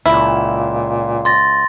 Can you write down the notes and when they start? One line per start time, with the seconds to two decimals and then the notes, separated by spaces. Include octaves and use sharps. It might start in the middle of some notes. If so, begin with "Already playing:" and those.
0.06 C#2 A#2 E4
1.25 C6 A6 A#6